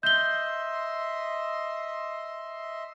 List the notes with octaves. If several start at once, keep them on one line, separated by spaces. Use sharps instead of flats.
D#5 E5 C6 G6 G7